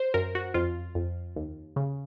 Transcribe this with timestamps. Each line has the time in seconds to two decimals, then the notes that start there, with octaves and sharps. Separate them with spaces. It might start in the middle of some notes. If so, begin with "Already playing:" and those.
Already playing: C5
0.14 F#2 A#4
0.35 F#4
0.54 F2 F4
0.95 F2
1.36 D#2
1.76 C#3